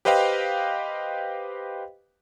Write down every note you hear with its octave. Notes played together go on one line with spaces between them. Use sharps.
G4 B4 C5 D#5 F5 G5